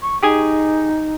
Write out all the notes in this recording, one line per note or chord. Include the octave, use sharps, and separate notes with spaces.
C#6
D#4 G4 G#4 G#5